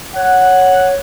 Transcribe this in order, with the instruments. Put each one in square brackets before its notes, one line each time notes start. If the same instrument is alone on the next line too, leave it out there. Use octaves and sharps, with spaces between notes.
[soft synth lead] C#5 [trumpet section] F#5